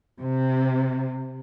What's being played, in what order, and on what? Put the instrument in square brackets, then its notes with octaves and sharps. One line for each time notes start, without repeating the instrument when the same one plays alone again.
[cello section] C3